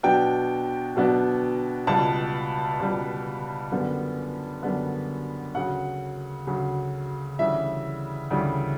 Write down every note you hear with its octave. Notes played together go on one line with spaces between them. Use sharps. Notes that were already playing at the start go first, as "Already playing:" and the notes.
B2 F#3 B3 D4 G5
B2 F#3 B3 D4
C#2 B2 G3 A5
C#2 B2 G3
F#2 D3 G3 B3
F#2 D3 G3 B3
D2 C#3 F#3 F#5
D2 C#3 F#3
D2 C#3 E3 G3 E5
D2 C#3 E3 G3